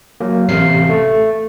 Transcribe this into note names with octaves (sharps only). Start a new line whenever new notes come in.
F#3 A#3
A1 C3 F5 C7
A3